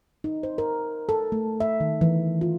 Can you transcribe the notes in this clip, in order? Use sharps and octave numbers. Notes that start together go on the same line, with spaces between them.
D#4
C5
A#4
A4
A3
E5
D#3
E3
F4